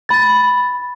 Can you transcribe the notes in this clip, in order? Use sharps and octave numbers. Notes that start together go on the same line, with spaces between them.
B5 A6